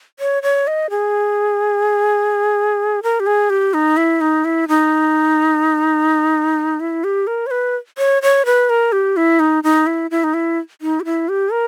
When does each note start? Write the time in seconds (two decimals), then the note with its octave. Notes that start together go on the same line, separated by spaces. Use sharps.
0.19 C#5
0.43 C#5
0.67 D#5
0.90 G#4
3.03 A#4
3.20 G4
3.26 G#4
3.50 G4
3.74 D#4
3.97 E4
4.21 D#4
4.45 E4
4.68 D#4
6.80 E4
7.04 G4
7.27 A#4
7.47 C#5
7.51 B4
7.98 C#5
8.22 C#5
8.46 B4
8.70 A#4
8.92 G4
9.17 E4
9.40 D#4
9.64 D#4
9.87 E4
10.11 E4
10.24 D#4
10.34 E4
10.81 D#4
11.00 G4
11.05 E4
11.29 G4
11.52 A#4